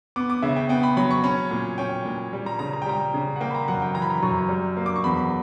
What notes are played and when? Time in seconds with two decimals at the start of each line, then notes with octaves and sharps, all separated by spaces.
0.16 B3 D6
0.30 D6
0.42 C#3 E5
0.56 G5
0.69 B3 G5
0.83 B5
0.97 F#3 B5
1.11 C#6
1.24 C#4 B5
1.51 A#2
1.78 C#4 G5
2.05 A#2
2.33 G3
2.46 A#5
2.59 C#3 A#5
2.73 A#5
2.82 G5
2.86 G3 A#5
3.14 C#3
3.36 F#5
3.40 A#3 G5
3.51 B5
3.55 A#5
3.68 F#2 F#5
3.82 G5
3.95 E3 A#5
4.02 B5
4.10 A#5
4.23 F#2 C#6
4.49 G3
4.77 A#3
4.86 D6
4.96 C#6
5.04 E2 B5